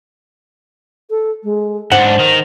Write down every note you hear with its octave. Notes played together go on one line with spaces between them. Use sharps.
A4
G#3
G#2 D4 C5 F#5
D#3